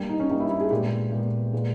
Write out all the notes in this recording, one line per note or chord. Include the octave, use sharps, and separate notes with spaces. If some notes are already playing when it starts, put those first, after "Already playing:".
Already playing: G2 G3 A#3
D#4
C#4
G2 G3 A#3 D#4
E4
E4
G#4
A#2 G#3 B3 G4
A#2 G#3 B3
A#2 G#3 B3